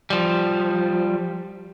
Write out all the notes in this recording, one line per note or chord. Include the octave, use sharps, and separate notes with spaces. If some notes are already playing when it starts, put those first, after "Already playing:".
F3 G3